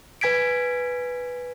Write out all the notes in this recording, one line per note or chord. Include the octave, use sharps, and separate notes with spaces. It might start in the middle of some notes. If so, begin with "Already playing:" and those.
B4 G#5 G#6 B6 D7